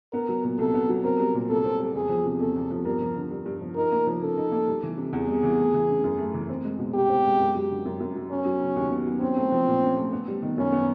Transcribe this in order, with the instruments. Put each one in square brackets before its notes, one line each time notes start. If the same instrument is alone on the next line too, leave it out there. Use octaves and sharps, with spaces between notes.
[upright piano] B3 [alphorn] A#4
[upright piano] F#3
A#2
[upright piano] C2 [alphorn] A4
[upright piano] B3
F#3
[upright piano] C4 [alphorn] A#4
[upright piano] G3
A#2
[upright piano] C2 [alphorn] A4
[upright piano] C4
G3
[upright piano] E2 [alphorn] G#4
[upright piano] F3
C3
[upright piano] E2 [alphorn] A4
[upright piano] E2
F3
[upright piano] G2 [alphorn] A#4
[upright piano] F3
D3
G2
G2
F3
[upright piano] D#4 [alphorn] A#4
[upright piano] A#3
F3
[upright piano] C#3 [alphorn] A4
[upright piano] D#4
A#3
G3
E3
C3
[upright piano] E2 [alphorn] G#4
[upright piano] G3
E3
A3
E3
C#3
F#2
A3
E3
C4
G#3
B2
[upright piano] C2 [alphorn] G4
[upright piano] C4
G#3
F#2
F#3
D3
F#2
F#2
F#3
[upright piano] B3 [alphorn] C#4
[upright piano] F#3
C#3
D#2
B3
F#3
[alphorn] C4 [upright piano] C#4
[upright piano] A3
F3
A#2
C#4
A3
B3
G3
D#3
[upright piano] F#2 [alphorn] C#4
[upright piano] B3